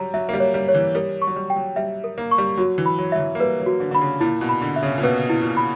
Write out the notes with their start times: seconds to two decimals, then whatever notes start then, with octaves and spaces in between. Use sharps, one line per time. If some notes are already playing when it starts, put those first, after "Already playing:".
Already playing: F#3 G3 A#5
0.14 F#3 E5
0.29 A#3
0.33 G3
0.40 C#5
0.54 G3
0.68 C#5
0.75 E3
0.95 G3 A#4
1.22 C#6
1.27 F#3
1.36 G3
1.50 G5
1.56 F#3
1.76 G3 E5
2.04 A#4
2.18 A#3
2.31 C#6
2.38 G3
2.57 F#3 F#4
2.78 E3
2.86 B5
2.98 F#3
3.12 F#3 E5
3.20 E3
3.35 A#3
3.40 G3 B4
3.60 F#3
3.66 F#4
3.80 D3
3.91 D3 B5
4.01 C#3
4.21 A#2 E4
4.41 B2
4.49 B5
4.62 D3
4.76 E5
4.83 C#3
4.98 A#2
5.03 B2 B4
5.30 E4
5.43 A#2
5.57 B5